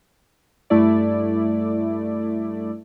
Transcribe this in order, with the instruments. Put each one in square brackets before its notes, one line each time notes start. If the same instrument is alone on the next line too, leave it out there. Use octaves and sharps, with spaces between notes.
[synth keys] G2 A3 E4 D5